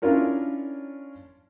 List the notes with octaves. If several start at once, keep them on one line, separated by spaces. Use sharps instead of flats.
C#4 D4 E4 F4 A#4 C#5